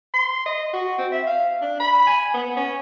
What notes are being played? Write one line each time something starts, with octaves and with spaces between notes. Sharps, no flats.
C6
D#5
F#4
C4
E5
F5
D4
B5
G#5
B3
C#4